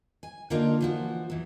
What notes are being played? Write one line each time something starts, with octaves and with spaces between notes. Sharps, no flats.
G#5
D3 A#3 D4 D#4 F4 A#4
E3 F3 F#4
E2 E3